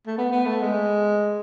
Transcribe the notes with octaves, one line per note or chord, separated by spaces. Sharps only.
A3
B3
B3
A3
G#3